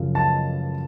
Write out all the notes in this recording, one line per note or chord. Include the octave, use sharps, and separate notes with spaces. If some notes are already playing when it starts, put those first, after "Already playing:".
Already playing: F#2 C#3 F3
A5